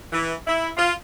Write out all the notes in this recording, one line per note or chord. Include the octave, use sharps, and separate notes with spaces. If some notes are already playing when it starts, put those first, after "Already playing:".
E3
E4
F4